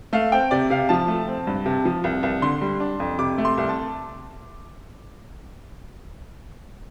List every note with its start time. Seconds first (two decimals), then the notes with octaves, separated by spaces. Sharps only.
0.13 A3 F5
0.32 C4 G5
0.51 C3 D5
0.70 C3 F5
0.89 F3 A5
1.08 A3
1.28 C4
1.47 G2
1.66 C3
1.85 F3
2.04 C2
2.23 C2
2.42 D3 C6
2.61 G3
2.80 D4
3.00 F2
3.19 C3 D6
3.38 A3
3.45 C6
3.58 C2
3.69 A5